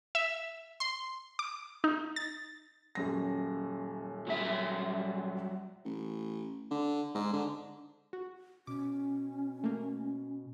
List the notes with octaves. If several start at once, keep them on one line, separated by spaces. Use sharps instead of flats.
E5
C6
D6
D#4
A6
D#1 F#2 A#6
F#3 G3 E5
A1
D3
G#2
D3
F#4
B2 C#4 D6
A3 A#3